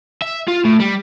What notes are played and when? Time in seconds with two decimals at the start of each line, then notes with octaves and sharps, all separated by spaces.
0.22 E5
0.48 F4
0.65 A2
0.80 G3